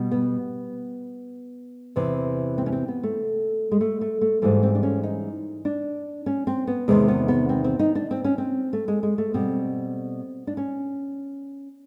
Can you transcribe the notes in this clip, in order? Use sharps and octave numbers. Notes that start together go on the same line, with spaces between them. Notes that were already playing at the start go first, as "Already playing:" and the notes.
Already playing: B2 G3
B3
E2 C3 E3
C4
C#4
C4
B3
A3
G#3
A3
A3
A3
G#2 E3 G3 A3
C4
D4
C#4
D#4
D4
C#4
C4
B3
E2 C3 D#3 G#3
B3
B3
C4
C4
D#4
D4
C4
C#4
C4
A3
G#3
G#3
A3
B2 G3 C4
D4
C#4